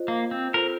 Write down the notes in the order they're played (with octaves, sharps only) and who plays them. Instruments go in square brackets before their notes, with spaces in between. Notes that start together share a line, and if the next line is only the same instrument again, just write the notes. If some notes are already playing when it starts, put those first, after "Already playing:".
Already playing: [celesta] F4 C5 D#5
[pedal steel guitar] A#3
C4
[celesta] F4 A4 C5 [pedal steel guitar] A#4